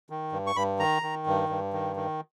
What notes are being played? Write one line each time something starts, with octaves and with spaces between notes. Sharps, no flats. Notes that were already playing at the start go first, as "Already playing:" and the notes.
D#3
G2
C#6
G2 B5
D#3 A#5
D#3
G2
G2
D#3
D#3